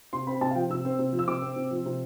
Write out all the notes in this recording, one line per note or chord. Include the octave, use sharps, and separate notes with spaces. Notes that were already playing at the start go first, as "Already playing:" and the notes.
C3 C6
C4 B5
C3 A5
F5
F3 G5
C3 E6
C4
C3
F3
E6
C3 D6
C4
C3
F3
C3